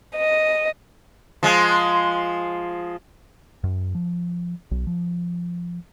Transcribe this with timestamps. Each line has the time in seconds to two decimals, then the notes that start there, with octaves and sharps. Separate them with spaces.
0.16 D#5
1.43 F3 G#3
3.64 F#2
3.95 F3
4.71 B1
4.87 F3